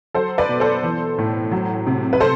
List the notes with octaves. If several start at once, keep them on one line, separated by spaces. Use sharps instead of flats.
F#3 A4 C5
B4 D5
B2
A4 C5
E3
A2
F#3
C3
B4
A4 C5